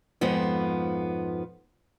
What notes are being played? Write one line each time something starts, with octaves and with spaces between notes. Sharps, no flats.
F2 G#2 F3 B3